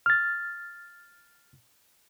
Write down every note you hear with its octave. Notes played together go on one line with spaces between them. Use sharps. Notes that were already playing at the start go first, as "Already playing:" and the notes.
F6 A6